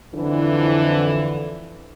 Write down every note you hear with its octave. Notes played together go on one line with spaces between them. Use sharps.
F2 D3 E3